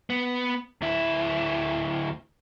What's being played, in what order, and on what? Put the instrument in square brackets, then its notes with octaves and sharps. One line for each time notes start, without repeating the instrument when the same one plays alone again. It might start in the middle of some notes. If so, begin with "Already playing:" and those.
[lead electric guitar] B3
D2 E4